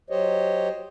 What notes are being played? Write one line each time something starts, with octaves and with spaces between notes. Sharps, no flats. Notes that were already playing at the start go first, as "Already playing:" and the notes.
F#3 G4 C5 C#5 D#5